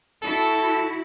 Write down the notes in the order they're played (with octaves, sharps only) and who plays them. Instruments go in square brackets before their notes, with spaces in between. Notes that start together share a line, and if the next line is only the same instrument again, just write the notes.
[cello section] E4 F#4 [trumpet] A4